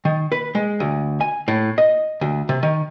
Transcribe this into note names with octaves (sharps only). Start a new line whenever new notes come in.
D#3
B4
G#3
D2
G#5
A2
D#5
D2
C3
D#3